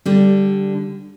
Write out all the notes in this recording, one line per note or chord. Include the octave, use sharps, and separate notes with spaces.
D3 G3